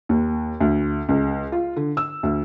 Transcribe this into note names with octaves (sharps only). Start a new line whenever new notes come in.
D#2
D2
C#2
F4
D3
E6
D2